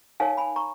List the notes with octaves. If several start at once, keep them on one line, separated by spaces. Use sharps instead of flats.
D#4 A#4 C#5 F5 G#5
G#5 B5
A#5 C#6